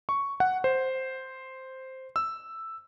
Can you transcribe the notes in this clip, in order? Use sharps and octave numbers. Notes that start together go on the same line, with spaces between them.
C#6
F#5
C5
E6